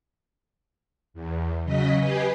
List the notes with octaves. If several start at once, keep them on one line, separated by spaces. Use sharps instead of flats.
E2
C#3 F#3 D#5 B6
G4 B4 D#5 G#5 C7